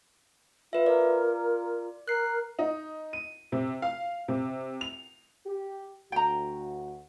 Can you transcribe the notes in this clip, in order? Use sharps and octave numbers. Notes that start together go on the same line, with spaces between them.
F4 B4 E5
A#4 D5
A#4 F#6 C7
D#4
D#7
C3
F5
C3
F7
G4
D2 F#4 G5 A#5